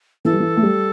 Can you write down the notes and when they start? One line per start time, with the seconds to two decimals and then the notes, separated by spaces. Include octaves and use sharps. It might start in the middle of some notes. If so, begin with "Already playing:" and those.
0.25 E3 A4
0.32 G3
0.40 E3
0.57 A3
0.62 G3